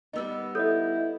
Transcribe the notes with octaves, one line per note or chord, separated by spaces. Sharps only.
G3 B3 D#4 D#5 E6
E4 A4 C#5 D#5 G6